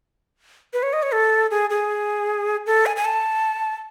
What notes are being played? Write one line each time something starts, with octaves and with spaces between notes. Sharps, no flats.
B4
C#5
D#5
C#5
A4
G#4
G#4
A4
G#5
G#5
A5